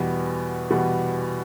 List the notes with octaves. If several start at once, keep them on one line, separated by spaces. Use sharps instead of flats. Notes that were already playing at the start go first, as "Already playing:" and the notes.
Already playing: E2 B2 G3 B3
E2 B2 G3 B3